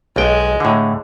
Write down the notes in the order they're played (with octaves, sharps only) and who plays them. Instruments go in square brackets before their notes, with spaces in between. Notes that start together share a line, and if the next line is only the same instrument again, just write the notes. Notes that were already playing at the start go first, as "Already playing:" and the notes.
[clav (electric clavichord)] B1 G5 [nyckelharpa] G#3
[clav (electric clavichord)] A2 D3